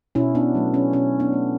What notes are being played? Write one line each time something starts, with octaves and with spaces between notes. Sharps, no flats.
B2 C#4 E4
B3 D4
F#3 A3
C#4
B2 C#4
B3 D4
A3